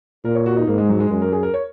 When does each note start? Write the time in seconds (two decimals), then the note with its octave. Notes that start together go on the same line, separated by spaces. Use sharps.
0.25 A#2 A#4
0.35 C#5
0.46 F#4
0.57 D#4
0.67 G#2 A#3
0.78 G#3
0.89 F#3
1.00 G#3
1.11 F#2 G#3
1.22 A#4
1.32 G#4
1.43 A#4
1.54 C#5